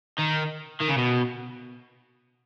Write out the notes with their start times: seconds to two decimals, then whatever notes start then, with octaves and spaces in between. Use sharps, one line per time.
0.19 D#3
0.80 D#3
0.88 C#3
0.97 B2